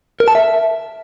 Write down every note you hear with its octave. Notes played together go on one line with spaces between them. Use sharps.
A#4
A5
E5